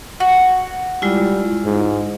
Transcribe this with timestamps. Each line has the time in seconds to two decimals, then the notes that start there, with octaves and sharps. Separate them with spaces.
0.20 F#4
1.02 G3 G#3 E4 F4
1.65 G#2